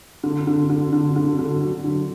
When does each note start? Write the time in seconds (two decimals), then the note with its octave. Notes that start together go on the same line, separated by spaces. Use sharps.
0.24 D3
0.47 D3
0.70 D3
0.93 D3
1.16 D3
1.39 D3
1.61 F#3
1.85 D3